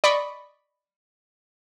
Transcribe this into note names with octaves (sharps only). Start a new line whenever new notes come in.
D5 D#5 B5 C#6